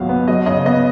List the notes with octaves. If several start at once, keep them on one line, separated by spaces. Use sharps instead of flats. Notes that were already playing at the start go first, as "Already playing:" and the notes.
Already playing: G#1 C#2 B2 F#3 F5
B3
F#3 D#5
C#3 D#5
B3 D#5